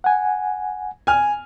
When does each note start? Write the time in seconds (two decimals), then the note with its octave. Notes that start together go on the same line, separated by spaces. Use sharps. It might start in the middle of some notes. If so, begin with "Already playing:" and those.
0.04 F#5 G#5
1.07 G#5 F6